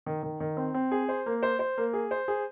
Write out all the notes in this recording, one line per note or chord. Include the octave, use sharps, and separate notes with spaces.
D#3
D#3
D#3
C4
C4
G#4
C5
A#3
C5
C5
A#3
G#4
C5
G#4